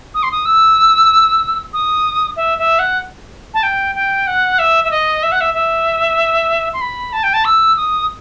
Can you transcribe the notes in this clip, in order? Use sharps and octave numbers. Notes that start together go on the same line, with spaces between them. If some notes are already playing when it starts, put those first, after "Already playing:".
D#6
C6
D#6
E6
D#6
E5
E5
F#5
A5
G5
G5
F#5
E5
E5
D#5
E5
F#5
E5
E5
C6
B5
A5
G5
A5
E6
D#6